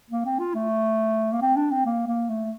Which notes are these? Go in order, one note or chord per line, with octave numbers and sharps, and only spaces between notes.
A#3
C4
F4
A3
A#3
C4
D4
C4
A#3
A#3
A3